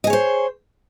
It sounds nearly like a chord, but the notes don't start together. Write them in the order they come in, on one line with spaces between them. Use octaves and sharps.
D#5 G#4 C#5 C5